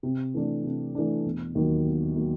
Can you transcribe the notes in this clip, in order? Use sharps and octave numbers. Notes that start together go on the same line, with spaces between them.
C3
E3 A3 D4
C3
E3 A3 D4
E1
D#2 D#3 F#3 A#3
E1
D#3 F#3 A#3